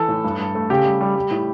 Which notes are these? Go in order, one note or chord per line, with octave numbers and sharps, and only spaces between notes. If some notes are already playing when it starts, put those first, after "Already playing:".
Already playing: E3 A4
A2
G2
G2
A3
C#3 G4
G3
G3
G3
A2